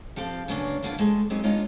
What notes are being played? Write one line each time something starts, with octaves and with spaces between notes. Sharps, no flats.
F3 C4 G4 A4 F5
C#3 F#3 A#3 B3 C#4 D4
E3 F#3 A#3 B3 D4 F4
D2 G#3 A3 A4 D5
F#3 G#3 B3 C4 D#4 G4
G#3 A#3 D4 D#4 F4 C#5